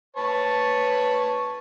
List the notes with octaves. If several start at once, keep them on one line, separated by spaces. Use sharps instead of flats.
B4 C#5 A5